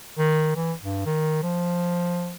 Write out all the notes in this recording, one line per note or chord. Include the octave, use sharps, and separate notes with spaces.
D#3
E3
G2
D#3
F3